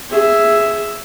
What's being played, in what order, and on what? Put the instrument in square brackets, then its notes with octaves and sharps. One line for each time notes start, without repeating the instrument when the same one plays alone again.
[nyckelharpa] G#4 E5